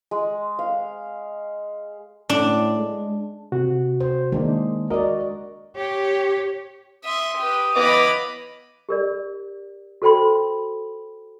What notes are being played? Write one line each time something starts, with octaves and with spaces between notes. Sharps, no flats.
G#3
F5
A2 D4
G#3
C3 F#4
C5
D#3 G#3 A#3 D4
F#4 A#4 D5 D#5
G4 C#5
E5 C6 D#6
G4 B4
E3 B3 D#5 F5 B5 D6
G4 A#4 D5
F#4 A4 C5 G5 B5 C6